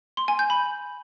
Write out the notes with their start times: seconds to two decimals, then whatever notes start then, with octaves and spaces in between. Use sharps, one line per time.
0.17 C6
0.28 G#5
0.39 G6
0.50 B5